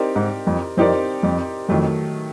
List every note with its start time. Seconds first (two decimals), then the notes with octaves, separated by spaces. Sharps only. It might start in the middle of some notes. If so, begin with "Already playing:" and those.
Already playing: C4 D#4 G4 A#4 D5
0.16 G#2
0.47 F2
0.77 F2 C4 D#4 G4 A#4 D5
1.23 F2
1.69 F2 D#3 F#3 A3